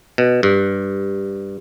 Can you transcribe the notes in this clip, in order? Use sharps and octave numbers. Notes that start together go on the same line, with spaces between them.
B2
G2